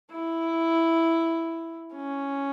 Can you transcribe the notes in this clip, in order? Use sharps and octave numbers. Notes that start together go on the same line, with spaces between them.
E4
C#4